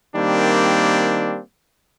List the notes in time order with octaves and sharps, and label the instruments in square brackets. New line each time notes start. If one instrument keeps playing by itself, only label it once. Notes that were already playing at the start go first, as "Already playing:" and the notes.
[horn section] D#3 G3 A#3 C4 D4